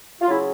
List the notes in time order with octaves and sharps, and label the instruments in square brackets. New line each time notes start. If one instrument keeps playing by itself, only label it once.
[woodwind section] F4
C#3 F#3 E4